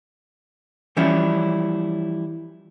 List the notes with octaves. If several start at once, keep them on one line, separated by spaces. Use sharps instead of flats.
E3 F3 G3 C#4 E4